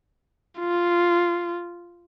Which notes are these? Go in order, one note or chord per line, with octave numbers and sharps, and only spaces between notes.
F4